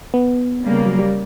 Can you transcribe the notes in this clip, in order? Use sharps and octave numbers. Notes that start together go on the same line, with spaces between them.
B3
C#3 G3 A#3
F#3
G3